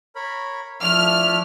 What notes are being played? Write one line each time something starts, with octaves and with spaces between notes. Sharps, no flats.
A#4 C#5 B5
F3 A3 D4 E4 F6